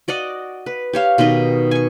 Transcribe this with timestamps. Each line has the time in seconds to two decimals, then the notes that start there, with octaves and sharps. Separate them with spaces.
0.08 F#4 D5 D#5 F#5
0.66 B4
0.93 G4 C#5 F5
1.18 B2 D#3 B4 D#5
1.71 G#5 C#6